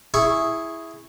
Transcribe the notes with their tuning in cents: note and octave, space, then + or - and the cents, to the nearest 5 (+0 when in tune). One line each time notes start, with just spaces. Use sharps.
E4 +0 G#4 +0 C#6 -10